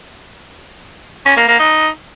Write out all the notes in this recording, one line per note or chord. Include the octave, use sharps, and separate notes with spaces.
C#4
A#3
A#3
D#4